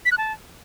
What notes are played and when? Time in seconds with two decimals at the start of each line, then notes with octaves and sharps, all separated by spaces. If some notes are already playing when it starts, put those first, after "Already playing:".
0.05 B6
0.12 F#6
0.18 A5